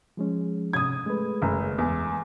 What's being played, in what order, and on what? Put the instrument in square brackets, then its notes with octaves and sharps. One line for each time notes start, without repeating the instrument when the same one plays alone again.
[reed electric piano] F3 G#3 C#4
[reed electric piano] G#2 C3 C#4 [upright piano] D#6 G#6
[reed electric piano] G#3 A3 B4
[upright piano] F#1
E2